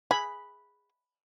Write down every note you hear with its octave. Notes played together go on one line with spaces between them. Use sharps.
G#4 B5